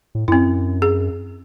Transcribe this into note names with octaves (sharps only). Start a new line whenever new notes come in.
A2
F#2 C4 E4
G#4